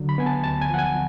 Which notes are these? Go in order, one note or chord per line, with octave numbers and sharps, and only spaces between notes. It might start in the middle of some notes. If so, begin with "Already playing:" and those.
Already playing: D3 F#3
B5
B3 G#5
A5
D2 A5
G#5
F3 F#5
G#5